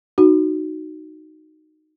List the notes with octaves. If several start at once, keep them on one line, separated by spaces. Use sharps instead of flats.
D#4 F#4